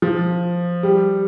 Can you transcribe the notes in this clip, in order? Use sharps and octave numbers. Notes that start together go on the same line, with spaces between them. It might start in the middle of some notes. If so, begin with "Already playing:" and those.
F3
G3